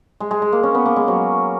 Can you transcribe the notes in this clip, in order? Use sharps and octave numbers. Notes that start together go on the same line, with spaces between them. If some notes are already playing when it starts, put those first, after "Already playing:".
G#3
G#3
G#3
A#3
C#4
B3
A#3
G#3
F#3